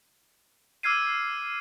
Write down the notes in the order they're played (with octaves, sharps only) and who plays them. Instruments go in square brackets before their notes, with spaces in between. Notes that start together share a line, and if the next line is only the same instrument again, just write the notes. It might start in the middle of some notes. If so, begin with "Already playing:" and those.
[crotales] D6 E6 F6 G#6 C7 D#7